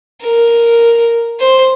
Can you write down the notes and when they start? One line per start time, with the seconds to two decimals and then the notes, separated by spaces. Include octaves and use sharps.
0.22 A#4
1.40 C5